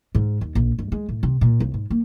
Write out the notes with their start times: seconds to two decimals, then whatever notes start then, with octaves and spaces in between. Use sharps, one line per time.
0.15 G#2
0.41 D#2
0.55 A#1
0.79 G2
0.92 G#3
1.09 A2
1.23 C3
1.41 A#2
1.60 C2
1.74 G#2
1.90 A#3